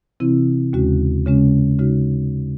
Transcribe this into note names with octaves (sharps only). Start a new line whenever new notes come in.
C3 E3 C4 E4
D#2 C#3 G#3 C#4 F#4
C#3 G#3 C#4
C#3 G#3 D#4 F#4